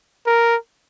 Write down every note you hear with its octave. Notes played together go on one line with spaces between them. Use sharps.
A#4